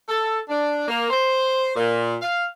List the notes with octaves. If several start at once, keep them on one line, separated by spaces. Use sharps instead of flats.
A4
D4
A#3
C5
A#2
F5